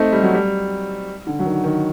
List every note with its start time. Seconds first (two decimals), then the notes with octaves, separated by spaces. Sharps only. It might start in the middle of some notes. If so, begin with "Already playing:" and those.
Already playing: A3 C4 D#4
0.12 G3
0.23 F#3
0.35 G3
1.27 D3
1.39 F#3
1.45 D#3
1.64 D#3